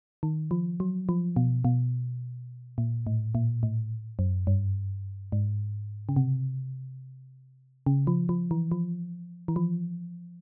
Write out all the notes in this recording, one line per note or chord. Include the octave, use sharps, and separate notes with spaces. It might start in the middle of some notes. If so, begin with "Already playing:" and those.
D#3
F3
F#3
F3
B2
B2
A#2
A2
A#2
A2
F#2
G2
G#2
C#3
C3
C#3
F3
F3
E3
F3
E3
F3